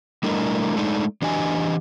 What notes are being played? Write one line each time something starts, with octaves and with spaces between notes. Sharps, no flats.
G3 A3 D4 E4 A#4 D#5
G#3 A3 D4 D#4
E3 D4 G4 D#5 G#5